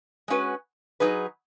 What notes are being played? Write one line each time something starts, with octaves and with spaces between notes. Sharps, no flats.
G#3 C#4 F#4 B4
F#3 D#4 G#4 B4